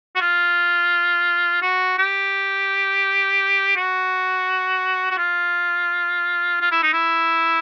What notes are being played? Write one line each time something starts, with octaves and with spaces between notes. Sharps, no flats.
F#4
F4
F#4
G4
F#4
F#4
F4
F4
E4
D#4
E4